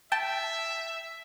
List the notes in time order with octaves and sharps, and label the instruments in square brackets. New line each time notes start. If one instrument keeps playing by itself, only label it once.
[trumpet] E5 [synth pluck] G5 A5 A6